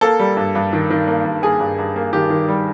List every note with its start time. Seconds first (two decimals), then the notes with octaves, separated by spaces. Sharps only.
0.01 A#3 A4
0.19 G3
0.37 G2
0.55 G2
0.73 D#3
0.90 D#3
1.08 A#3
1.25 G2
1.42 A#3 G#4
1.60 G2
1.78 G2
1.96 A#3
2.13 D#3 G4
2.30 D#3
2.48 G3